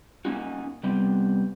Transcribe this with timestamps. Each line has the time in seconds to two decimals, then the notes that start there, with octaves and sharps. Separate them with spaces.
0.25 A#3 C#4 D#4 F#4
0.83 C3 G3 B3 C4